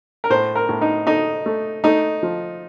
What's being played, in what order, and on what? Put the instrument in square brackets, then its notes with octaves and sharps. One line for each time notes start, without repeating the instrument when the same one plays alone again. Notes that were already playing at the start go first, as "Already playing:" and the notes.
[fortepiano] A#4
A2 C5
A#4
A2
D#4
A3 D#4
A3
A3 D#4
F3